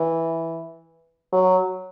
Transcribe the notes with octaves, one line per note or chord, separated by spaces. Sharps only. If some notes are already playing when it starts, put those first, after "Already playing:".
Already playing: E3
F#3